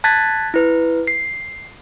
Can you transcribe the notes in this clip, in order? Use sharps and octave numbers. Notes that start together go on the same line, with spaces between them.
A5 F#6 G#6 A6 B6
E4 B4
C7